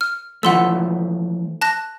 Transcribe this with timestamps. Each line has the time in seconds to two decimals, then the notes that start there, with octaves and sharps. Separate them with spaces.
0.01 F6
0.43 E3 F3 A3 F#5 C6 E6
1.61 A5 F#6 A#6